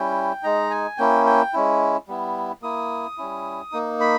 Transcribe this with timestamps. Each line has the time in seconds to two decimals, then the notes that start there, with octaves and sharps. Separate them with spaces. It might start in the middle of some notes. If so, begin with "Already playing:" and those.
Already playing: G3 C#4 E4 G5
0.43 G#3 D#4 A#5
0.70 G#5
0.98 A#3 C#4 E4 G5
1.26 G5
1.53 G#3 C#4 E4
2.08 G3 B3 E4
2.62 A#3 E4 D#6
3.18 G3 C#4 E4
3.72 A#3 D#4
4.01 B5